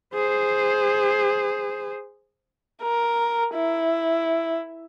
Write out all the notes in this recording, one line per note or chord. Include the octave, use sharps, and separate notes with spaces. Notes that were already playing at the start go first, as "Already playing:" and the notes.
G#4 C5
A#4
E4